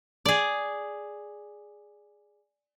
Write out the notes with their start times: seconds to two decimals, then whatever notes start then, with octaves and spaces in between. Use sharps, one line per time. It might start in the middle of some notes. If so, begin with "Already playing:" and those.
0.25 G#4 D5